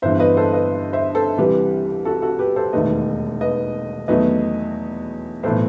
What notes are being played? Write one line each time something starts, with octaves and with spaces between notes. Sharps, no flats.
G1 G2 E3 C5 E5
B4 D#5
A4 C5
B4 D#5
C5 E5
A4 C5
C2 C3 E3 G3 G4 B4
F#4 A4
F#4 A4
G4 B4
A4 C5
E1 D#2 D#3 A3 B4 D#5
B4 D#5
E2 D#3 F#3 A3 B4 D#5
B1 A2 E3 A4 C5